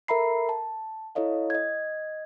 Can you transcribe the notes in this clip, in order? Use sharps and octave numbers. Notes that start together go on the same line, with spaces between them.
A4 A#4 E5 A#5 B5 C7
A5
E4 A4 C#5 D#5 F5
D#5 G#6